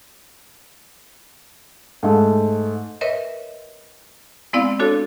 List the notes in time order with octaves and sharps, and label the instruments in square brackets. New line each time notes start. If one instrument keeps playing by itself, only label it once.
[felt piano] G#2 A3
[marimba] A#4 B4 C#5 D#5 E5
G#3 B3 C4 E4 D5 F5
D4 F#4 A4 C#5